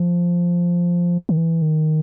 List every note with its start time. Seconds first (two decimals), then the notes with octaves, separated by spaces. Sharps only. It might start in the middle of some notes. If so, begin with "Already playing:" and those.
Already playing: F3
1.29 D#3
1.37 E3
1.62 D#3